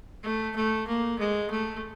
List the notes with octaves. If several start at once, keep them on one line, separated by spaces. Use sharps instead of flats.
A3
A3
A#3
G#3
A3